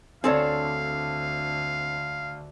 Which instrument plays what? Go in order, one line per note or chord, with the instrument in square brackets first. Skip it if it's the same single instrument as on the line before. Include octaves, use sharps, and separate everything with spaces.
[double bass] D2 D3 [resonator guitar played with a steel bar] C4 A4 C#5 [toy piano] D4 D5 [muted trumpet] F5